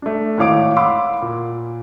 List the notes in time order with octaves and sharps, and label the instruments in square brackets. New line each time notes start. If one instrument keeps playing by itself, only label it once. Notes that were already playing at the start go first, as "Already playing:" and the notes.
[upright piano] A3 D4
G#1 A2 C#5 F5 D6 D7
F5 F#5 B5 C6 D6 E6
A#2